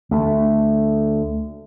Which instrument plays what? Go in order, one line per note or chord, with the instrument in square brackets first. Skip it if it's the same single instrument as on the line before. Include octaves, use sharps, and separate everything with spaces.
[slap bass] D2 A3